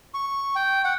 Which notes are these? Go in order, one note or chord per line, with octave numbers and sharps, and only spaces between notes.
C#6
G5
F#5